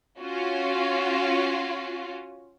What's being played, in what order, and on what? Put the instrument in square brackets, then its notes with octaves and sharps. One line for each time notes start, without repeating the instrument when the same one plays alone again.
[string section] C#4 F4 F#4